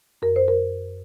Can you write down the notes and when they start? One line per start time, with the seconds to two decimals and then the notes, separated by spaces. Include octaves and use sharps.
0.22 F#2 A#4
0.36 C5
0.48 A#4